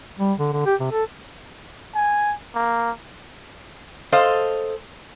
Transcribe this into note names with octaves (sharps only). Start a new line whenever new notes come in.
G3
D3
D3
G4
C3
A4
G#5
A#3
A4 C5 D#5 F5